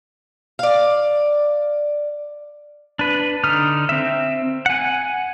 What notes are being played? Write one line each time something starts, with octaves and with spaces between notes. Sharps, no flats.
D5 F5
D4 B4
D3 D#4 D#6 F6
C4 E5
F#5 G#5